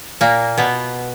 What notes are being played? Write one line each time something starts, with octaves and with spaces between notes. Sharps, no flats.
A#2 A#3
B2 B3